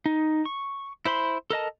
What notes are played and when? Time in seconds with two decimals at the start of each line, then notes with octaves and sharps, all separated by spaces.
0.06 D#4
0.45 C#6
1.05 E4 C5 B5 C6
1.50 A4 A#4 D#5 A5